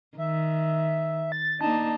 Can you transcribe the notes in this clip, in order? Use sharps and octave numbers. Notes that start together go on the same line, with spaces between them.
D#3 E5
A6
A#3 D4 D#4 A5